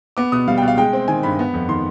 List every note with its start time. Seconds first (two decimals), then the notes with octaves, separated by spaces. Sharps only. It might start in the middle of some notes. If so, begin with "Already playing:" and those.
0.17 B3 D6
0.32 B2 D#6
0.48 G3 F5
0.58 B2 G5
0.68 F5
0.78 G#3 G5
0.93 C4
1.08 D#3 G#5
1.23 G2 B5
1.39 B3
1.54 F2
1.69 D#3 C6